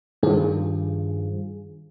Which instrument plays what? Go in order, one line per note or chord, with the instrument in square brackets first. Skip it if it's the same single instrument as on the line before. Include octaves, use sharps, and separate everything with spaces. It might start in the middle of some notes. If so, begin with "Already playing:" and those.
[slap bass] G2 F3 [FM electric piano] D#3 G#4